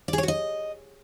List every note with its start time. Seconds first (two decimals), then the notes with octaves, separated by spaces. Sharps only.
0.08 D5
0.13 G#4
0.18 C#5
0.23 F#4
0.28 D#5